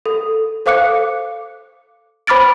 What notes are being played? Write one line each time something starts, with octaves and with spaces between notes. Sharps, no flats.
A4
A4 C5 F5 D6 F#6 C#7
C5 B5 D6 F6 A6 D7